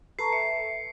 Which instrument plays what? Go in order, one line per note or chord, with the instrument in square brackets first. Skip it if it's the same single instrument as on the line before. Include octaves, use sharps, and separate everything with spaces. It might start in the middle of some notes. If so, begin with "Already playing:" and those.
[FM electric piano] A4 B4 [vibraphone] A5 A#5 C#6 [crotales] C7
[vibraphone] E5 [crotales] C#7